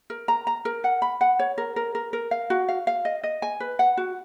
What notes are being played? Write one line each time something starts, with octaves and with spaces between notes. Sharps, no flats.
A#4
A#5
A#5
A#4
F#5
B5
F#5
C#5
A#4
A#4
A#4
A#4
F5
F#4
F5
F5
D#5
D#5
G#5
B4
F#5
F#4